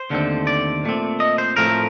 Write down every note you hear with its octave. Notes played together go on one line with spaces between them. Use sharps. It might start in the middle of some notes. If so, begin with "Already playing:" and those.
Already playing: C5
D#2 D3 A3 C4
D5
A#2 A3 C4
D#5
C5
A2 F3 A3 C4 A#4